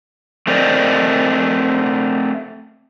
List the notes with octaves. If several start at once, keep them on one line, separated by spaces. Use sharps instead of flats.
A3 C4 A#4 C5 D5 D#5